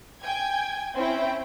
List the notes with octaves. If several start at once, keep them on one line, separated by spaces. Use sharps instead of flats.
G5 G#5 G#6
C4 C#4 E4 G5